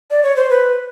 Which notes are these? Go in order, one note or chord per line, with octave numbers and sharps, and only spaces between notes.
D5
C#5
C5
B4